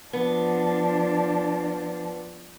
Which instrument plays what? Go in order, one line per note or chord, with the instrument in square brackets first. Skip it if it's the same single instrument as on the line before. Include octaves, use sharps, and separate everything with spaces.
[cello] F3 D4 [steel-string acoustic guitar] B3